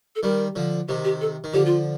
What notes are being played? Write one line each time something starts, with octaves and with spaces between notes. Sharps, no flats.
A4
D#3 G3 A#4
D3 F3
C3 D#3 G4
G4
A4
D#3
D3 F3 G4
F4